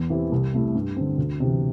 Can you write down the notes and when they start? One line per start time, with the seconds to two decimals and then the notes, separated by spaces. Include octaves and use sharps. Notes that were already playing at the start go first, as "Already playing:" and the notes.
Already playing: E2
0.10 E3 C4 E4 G4
0.32 C2
0.54 C3 A3 E4
0.75 G2
0.97 D3 C4
1.18 D2
1.40 C3 E3